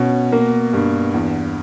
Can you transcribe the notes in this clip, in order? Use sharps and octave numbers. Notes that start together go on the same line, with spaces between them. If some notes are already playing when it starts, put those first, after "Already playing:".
Already playing: B2 C#4
A#3
G2
E2